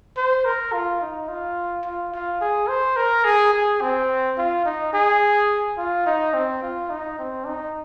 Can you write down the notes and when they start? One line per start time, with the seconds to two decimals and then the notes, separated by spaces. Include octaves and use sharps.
0.17 C5
0.45 A#4
0.73 F4
1.01 D#4
1.28 F4
1.85 F4
2.13 F4
2.41 G#4
2.69 C5
2.96 A#4
3.24 G#4
3.53 G#4
3.81 C4
4.38 F4
4.65 D#4
4.93 G#4
5.78 F4
6.06 D#4
6.34 C4
6.62 F4
6.90 D#4
7.19 C4
7.46 D#4